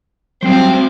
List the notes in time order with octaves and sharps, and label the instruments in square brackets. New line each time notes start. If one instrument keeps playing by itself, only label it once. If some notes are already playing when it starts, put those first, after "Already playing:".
[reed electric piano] F#3 G3 [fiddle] C4 [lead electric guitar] F#4 C5